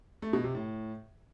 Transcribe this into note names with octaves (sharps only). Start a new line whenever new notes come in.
A3
B2
C3
A2